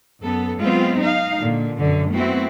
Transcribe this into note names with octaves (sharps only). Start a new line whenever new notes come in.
F#2 B3 A4
F#3 G#3 B3 C4 F4
D#4 F5
A#2 D3
F#2 B2 D3
A3 B3 C4 E4 F#4